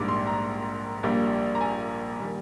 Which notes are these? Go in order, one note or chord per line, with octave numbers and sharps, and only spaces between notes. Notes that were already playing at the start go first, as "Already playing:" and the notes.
Already playing: A#1 G#2 G3 A#3 D6
C6
A#5
A#1 A#2 G3 A#3
A#5
G#5
D#3 G3